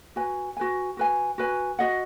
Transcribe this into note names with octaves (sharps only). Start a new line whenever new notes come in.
F#4 B4 G#5
F#4 B4 G#5
F#4 B4 G#5
F#4 B4 G#5
F#4 D#5 F#5